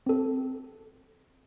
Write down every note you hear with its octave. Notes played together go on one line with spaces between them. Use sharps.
C4 A4